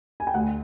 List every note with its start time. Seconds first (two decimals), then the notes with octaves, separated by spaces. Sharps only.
0.20 G#5
0.27 G5
0.34 D2 F#5